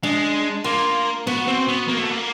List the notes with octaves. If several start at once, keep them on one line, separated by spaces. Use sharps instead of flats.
G#3 D4
A#3 F4
B3 F#4
C4
B3
A#3
A3
A#3